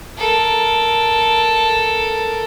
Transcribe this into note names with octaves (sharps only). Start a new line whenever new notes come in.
A4 A#4